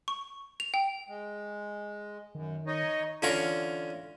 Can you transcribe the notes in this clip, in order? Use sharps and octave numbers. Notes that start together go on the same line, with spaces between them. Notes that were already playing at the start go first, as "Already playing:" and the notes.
C#6
F7
G5
G#3
F#2 D#3
D#4 C#5 D#5
D3 E3 C#4 F4 A#5 C#6